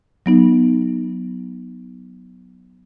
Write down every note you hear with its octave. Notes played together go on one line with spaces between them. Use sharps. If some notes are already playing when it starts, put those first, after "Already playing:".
F#3 B3 D#4